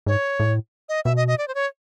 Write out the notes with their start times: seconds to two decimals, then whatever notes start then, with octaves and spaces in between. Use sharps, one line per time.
0.06 G#2 C#5
0.40 A2
0.89 D#5
1.05 B2 E5
1.17 D#5
1.28 D#5
1.38 D5
1.48 C5
1.55 C#5